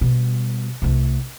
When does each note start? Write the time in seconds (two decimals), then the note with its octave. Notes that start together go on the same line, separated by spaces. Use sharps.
0.01 B2 G3
0.82 C2 A3